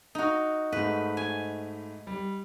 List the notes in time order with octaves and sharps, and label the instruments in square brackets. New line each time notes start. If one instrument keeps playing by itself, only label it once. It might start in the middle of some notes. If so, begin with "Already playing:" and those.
[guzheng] D#4 F#4
[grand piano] G#2 A3 B5 [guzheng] B4
[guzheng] G#5
[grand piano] G3